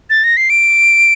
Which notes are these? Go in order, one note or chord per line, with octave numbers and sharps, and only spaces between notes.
A6
A#6
C7
D7